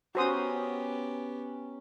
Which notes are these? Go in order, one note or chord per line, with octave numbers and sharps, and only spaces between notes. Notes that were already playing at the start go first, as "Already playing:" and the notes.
B3 C#4 F#4 G4 C5 G#5 A#5 D#6